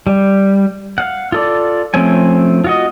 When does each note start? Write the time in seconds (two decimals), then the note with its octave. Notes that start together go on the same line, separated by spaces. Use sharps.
0.07 G3
0.98 F5 F#5
1.32 F4 A4 D5
1.94 F3 A3 C4 C#4 G#5
2.64 F4 F#4 D#5